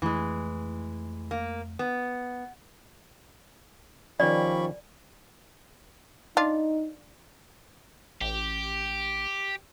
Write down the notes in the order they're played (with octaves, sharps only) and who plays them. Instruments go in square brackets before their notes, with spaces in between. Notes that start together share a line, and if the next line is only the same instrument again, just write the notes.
[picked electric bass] F2 A3 [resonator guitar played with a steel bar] E3 G#3
[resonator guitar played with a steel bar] A#3
B3
[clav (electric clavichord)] D#3 C#4 [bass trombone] F3 [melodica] G3 B5 C#6 [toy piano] D5
[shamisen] D4 F4 [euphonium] D#4
[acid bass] A1 [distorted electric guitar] G4